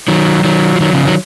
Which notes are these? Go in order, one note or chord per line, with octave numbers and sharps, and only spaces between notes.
D#3 F#3
D#3 F#3
F3
D#3 F#3
C#3 F3
D#3 F#3